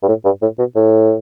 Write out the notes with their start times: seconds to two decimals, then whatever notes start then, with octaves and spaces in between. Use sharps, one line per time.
0.03 G2
0.08 A2
0.25 G2
0.42 A2
0.59 B2
0.75 A2